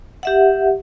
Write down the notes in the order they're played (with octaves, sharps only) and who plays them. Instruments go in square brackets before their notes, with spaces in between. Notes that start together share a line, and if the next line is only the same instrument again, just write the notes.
[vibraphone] G4 E5 F#5